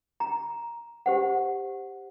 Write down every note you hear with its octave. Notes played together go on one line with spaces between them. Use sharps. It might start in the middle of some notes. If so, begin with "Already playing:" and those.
A#5
G4 C5 F#5